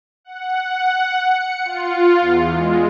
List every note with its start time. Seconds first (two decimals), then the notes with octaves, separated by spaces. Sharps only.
0.24 F#5
0.68 F#5
1.23 C#7
1.65 F4
2.20 E2
2.55 G#3